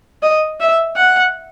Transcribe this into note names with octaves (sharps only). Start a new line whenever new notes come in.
D#5
E5
F#5